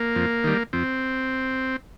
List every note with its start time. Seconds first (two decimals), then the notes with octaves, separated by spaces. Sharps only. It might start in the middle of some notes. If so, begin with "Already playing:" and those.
Already playing: A#3
0.16 F2
0.44 D#3 G3
0.73 F2 C4